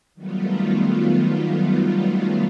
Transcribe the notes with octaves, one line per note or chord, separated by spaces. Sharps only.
D#3 F#3 G3 A3 B3 F4